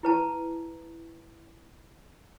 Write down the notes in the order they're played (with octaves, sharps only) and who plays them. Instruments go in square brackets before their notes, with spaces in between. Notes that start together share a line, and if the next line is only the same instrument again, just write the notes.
[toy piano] E4 B4 A5